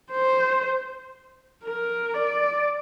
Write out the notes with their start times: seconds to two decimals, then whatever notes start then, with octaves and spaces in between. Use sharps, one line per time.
0.12 C5
1.64 A#4
2.14 D5